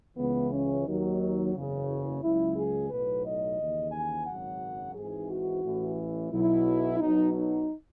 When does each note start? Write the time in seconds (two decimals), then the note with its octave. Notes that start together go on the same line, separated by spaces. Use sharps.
0.17 C#2 C#3 E3 B3
0.51 C#4
0.86 D#2 D#3 F#3
1.54 F#1 E2 C#3
2.22 C#2 C#3 F#3 E4
2.56 G#4
2.90 B1 A2 F#3 B4
3.24 D#5
3.59 D#2 C#3 E3
3.92 G#5
4.26 G#1 F#2 C#3 F#3 F#5
4.95 G#1 G#2 E3 G#4
5.29 F#4
5.63 A1 A2 E3
6.31 B1 B2 F#3 E4
7.00 B1 B2 F#3 D#4
7.34 D#4